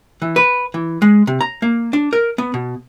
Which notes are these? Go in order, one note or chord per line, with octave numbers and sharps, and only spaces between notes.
E3
B4
E3
G#3
C3
A#5
A#3
D4
A#4
B3
B2